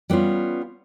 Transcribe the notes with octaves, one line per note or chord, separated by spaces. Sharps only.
G3 B3 C#4 F4